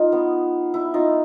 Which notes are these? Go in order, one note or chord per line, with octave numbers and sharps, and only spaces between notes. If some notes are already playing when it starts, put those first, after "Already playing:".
Already playing: D#4 F4
B3
E4
D#4 F4